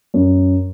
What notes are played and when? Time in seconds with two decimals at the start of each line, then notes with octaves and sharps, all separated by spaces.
0.14 F#2